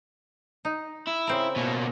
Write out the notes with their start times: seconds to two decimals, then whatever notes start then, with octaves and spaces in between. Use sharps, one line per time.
0.65 D#4
1.07 E4
1.27 C#3 C4 A#4
1.56 B2 A#3